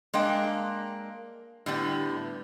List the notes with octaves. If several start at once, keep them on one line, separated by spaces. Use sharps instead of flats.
G#3 A#3 D4 G5
A2 D3 G3 B3